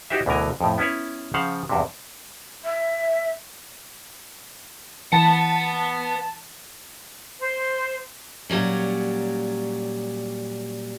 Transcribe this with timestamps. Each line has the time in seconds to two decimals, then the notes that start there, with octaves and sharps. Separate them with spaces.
0.10 D#4 E4 F#4 G4 C5 E5
0.26 D2 B2 D3 E3 A#4 G#5
0.61 F2 A2
0.78 B3 C#4 E4 B4 C#5
1.34 C#3 F3 C5 F5 F#5
1.69 E2 G2 C3
2.64 E5
5.13 E3 B4 F#5 A5
7.39 C5
8.50 A#2 F#3 G3 C#4